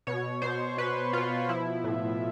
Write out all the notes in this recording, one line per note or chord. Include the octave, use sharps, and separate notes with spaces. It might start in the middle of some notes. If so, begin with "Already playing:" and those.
B2 C#5
B2 C5
B2 B4
B2 F4
F3 E4
A2